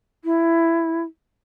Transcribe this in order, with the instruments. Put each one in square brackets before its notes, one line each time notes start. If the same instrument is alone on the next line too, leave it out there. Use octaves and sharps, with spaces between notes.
[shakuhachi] E4